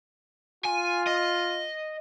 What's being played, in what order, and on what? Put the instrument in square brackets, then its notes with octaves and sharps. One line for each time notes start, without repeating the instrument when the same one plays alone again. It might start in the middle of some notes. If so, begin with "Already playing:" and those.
[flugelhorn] F4 [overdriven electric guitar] G#5
[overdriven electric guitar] D#5